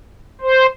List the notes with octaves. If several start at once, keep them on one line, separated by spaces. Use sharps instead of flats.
C5